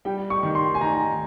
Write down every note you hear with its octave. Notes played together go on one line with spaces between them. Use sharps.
G3 G5
C#6
D#3
C6
G#5
D#3 A#5